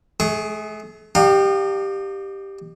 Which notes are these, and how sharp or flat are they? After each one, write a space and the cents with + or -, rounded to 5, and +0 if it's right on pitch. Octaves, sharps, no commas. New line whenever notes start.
A3 -40 G#4 +0 C#6 -5
D#4 -40 G4 +0 F5 +35